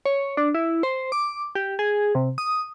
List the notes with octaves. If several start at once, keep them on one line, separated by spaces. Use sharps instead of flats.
C#5
D4
E4
C5
D6
G4
G#4
C3
D#6